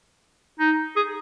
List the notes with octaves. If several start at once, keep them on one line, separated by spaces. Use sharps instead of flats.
D#4
G#4